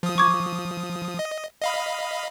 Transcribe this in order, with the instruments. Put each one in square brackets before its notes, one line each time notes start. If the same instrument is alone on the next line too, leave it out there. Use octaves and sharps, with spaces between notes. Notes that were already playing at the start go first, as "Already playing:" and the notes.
[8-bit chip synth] F3 D#6
[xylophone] C#6 D6 G#6
[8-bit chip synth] D#5
D#5 F5 B5